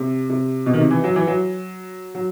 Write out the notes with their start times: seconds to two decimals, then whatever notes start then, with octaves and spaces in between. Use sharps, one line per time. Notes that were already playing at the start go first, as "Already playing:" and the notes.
Already playing: C3
0.30 C3
0.66 B2
0.73 D#3
0.79 C3
0.91 E3
1.04 F#3
1.16 E3
1.27 F#3
2.15 F#3